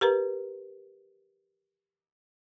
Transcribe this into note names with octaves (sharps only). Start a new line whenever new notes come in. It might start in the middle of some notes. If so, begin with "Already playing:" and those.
G4 A#4 B4 A#5